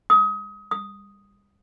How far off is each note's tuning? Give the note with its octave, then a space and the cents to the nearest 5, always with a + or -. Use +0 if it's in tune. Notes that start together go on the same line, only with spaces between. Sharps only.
D#6 +30
D#6 +5